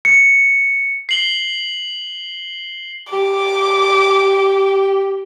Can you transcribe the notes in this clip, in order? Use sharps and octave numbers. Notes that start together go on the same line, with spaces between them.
C#7
C7 F#7 G7
G4 D6